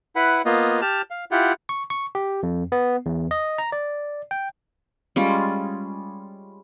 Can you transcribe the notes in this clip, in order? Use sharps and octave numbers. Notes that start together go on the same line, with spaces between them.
E4 B4 F#5 B5
A#3 B3 F4 D#5
G4 A5 F6
F5
E4 F4 G4 F#5
C#6
C#6
G4
F2
B3
E2
D#5
A#5
D5
G5
G3 G#3 C#4 F4